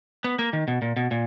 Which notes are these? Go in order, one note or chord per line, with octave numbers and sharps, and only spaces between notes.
B3
A#3
D#3
B2
A#2
B2
A#2